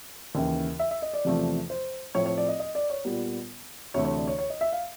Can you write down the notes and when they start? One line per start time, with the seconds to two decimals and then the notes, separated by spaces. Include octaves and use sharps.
0.35 D#2 C#3 E3
0.80 E5
0.91 E5
1.02 D#5
1.14 D5
1.25 E2 C3 F3 A3
1.70 C5
2.15 A2 F3 A3 C4 C#5
2.26 C#5
2.38 D5
2.49 D#5
2.60 D#5
2.75 D5
2.90 C#5
3.05 A#2 G3 B3
3.94 D2 C3 E3 A3 C#5
4.05 C#5
4.17 D5
4.28 C#5
4.39 C#5
4.50 D#5
4.61 E5
4.73 F5